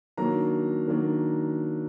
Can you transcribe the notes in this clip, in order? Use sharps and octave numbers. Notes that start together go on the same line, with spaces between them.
D#3 F#3 A#3 D4 A#5
D#3 F#3 A#3 D4